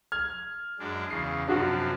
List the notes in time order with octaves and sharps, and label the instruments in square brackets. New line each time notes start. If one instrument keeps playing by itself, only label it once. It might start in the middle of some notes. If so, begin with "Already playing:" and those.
[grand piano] F6 G#6
[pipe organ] F#2 G#3 D4
[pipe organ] E2 C#3 [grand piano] C7
[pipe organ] F#2 C3 F3 [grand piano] D4 F#4